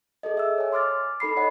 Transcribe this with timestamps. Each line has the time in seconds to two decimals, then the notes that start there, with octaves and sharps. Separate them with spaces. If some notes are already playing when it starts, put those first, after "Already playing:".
0.23 G#4 A4 D#5
0.37 E5 E6
0.58 C#5 G#5
0.72 C6 D6 F6 A6
1.20 D#4 A4 B5 C7
1.36 C#5 D#5 F#5